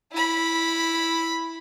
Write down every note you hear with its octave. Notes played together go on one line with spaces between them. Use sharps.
E4 B5